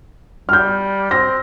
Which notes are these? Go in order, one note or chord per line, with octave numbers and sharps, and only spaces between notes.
G3 F6 G6
C4 A#6